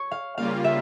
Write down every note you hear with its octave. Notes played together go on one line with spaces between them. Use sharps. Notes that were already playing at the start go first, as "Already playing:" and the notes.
Already playing: C#5
F5
C#3 G3 A#3 F4 F5
E5